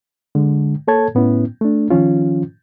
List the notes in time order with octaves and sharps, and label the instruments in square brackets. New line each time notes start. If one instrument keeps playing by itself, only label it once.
[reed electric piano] D3 G#3
A#3 A4 C#5 A5 G#6
A2 B3 C#4 E4
A3 D4
D#3 F3 C#4 F4